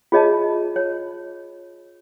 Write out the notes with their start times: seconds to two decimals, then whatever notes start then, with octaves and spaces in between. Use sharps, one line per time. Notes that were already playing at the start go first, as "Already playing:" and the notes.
0.12 F4 G#4 C#5 D#5 E5 A5
0.76 C#5